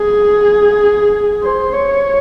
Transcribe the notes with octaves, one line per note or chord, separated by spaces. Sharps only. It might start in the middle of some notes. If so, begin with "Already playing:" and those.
Already playing: G#4
C5
C#5